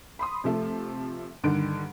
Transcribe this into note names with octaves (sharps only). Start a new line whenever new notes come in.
B5 C6 D#6
C3 F3 A3
G2 D3 D#3 D7